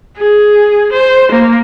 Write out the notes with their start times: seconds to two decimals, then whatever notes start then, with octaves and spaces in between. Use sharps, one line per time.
0.17 G#4
0.92 C5
1.31 A#3